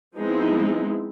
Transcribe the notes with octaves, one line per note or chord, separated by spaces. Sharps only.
F3 G#3 B3 C4 D#4 E4